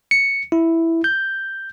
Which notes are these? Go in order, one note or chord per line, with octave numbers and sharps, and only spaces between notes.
C#7
E4
G6